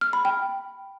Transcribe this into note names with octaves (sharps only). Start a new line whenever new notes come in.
F6
B5
G5